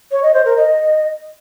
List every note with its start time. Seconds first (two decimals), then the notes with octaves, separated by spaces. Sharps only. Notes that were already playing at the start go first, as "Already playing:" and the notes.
0.11 C#5
0.23 D#5
0.34 C5
0.45 A#4
0.57 D#5